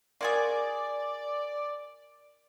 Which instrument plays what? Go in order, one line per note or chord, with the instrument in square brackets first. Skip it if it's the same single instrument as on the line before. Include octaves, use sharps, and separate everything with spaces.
[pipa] F4 F#4 G#4 [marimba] A#4 G#6 A6 [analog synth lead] D5